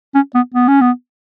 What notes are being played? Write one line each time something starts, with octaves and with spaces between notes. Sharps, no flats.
C#4
B3
B3
C#4
B3